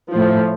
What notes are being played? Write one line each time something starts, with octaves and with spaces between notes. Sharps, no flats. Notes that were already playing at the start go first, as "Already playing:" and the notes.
A2 F3